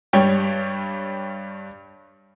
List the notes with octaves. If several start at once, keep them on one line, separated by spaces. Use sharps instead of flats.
G2 G3 C#5 G5